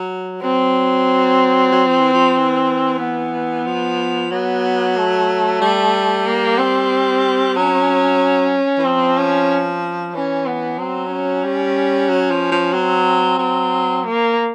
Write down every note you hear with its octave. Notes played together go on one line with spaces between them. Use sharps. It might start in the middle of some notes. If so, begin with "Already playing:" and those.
Already playing: F#3
F#3 C4
F#3
F3
E3
F3
E3
B3
F3
F#3 B3
A3
G3
A#3
C4
F#3 C#4
E3
F3 C4
C#4
E3 C#4
B3
F#3 C4
C#4
G3
F#3
F3
F3
F#3 C4
F#3
A#3